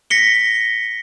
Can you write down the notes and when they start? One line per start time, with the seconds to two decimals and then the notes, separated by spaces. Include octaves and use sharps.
0.10 A#6 B6 C#7 G7